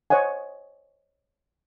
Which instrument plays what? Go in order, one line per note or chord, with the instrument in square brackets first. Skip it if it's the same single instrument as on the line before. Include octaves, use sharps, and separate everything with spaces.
[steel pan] C5 C#5 D#5 F#5 G#5